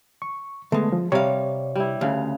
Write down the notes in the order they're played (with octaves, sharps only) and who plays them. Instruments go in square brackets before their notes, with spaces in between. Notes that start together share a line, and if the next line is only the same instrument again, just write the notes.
[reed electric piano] C#6
[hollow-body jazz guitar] D3 G#3 [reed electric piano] A3 B3
[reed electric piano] F3
[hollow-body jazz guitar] C3 F5 [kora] G3 [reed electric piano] C#5
[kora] G3 E4
[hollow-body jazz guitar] D2 [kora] C#3 F5